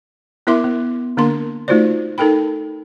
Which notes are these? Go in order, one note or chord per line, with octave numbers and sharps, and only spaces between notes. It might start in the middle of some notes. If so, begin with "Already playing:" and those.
B3 E4 A#4 E5 C6 D6
B3
D3 A#3 D4 A#4 C6
A3 D#4 F4 F#4 C5 D5
D#4 A4 A#4 G5 B5